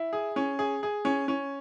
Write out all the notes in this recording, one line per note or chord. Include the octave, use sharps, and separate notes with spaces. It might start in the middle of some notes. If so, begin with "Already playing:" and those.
Already playing: E4
G#4
C#4
G#4
G#4
C#4
C#4